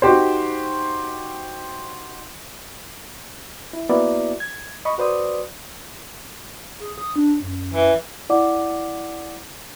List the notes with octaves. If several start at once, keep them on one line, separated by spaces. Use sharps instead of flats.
D#4 F#4 G4 C5
E4
A#3 B3 E4 F#4 A#4 D5
G#6
D#5 B5 C#6
F#4 B4 C5 D5 D#6
G#4
D#6
D4
F#2
E3
E4 D5 F#5 D6